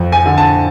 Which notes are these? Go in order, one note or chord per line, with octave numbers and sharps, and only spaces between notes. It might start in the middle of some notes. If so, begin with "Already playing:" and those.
Already playing: F2
G#5
D3
A5